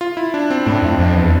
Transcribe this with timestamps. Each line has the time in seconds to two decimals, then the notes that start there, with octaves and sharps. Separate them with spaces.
0.01 F4
0.17 E4
0.34 D4
0.50 C4
0.66 A2 D4
0.82 F2
0.99 F2
1.15 E2